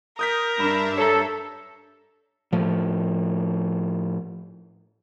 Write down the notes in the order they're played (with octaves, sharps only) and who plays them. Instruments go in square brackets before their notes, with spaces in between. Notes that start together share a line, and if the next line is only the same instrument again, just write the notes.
[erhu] A#4 [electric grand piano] D#6 G6 B6
[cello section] G2 D4 E5 [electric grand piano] B5
[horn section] A4 [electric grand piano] C#5 A#5
[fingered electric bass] A2 F3